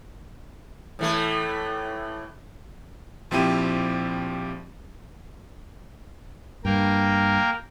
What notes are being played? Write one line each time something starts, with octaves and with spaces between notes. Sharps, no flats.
A2 E3 A3
A#1 F3 C4 E4 G4 D#7
G2 A#3 A#4 G5